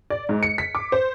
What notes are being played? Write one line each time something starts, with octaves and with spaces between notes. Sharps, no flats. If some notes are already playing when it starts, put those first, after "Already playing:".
D5
G#2
C#7
B6
D6
C5